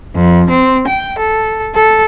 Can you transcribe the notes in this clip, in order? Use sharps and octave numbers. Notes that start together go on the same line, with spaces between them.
F2
C4
G5
A4
A4